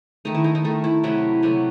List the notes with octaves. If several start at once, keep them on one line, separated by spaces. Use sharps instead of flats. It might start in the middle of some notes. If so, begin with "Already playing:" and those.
D#3 A3 D#4
E4
D#4
D#4
D#3 A3
E4
C3 F#3 A3 E4
C3 F#3 A3